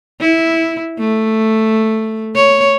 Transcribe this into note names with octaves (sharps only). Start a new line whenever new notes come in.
E4
A3
C#5